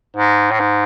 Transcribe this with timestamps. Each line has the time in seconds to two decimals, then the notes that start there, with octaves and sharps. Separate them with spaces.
0.16 G#2
0.51 A2
0.60 G#2